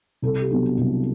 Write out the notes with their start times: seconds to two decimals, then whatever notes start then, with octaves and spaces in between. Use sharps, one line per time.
0.22 C2 A4
0.42 G4
0.50 B2 F#3 B3 D4
0.78 C2